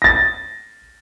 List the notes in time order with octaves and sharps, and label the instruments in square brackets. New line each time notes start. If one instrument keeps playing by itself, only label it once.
[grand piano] A6 A#6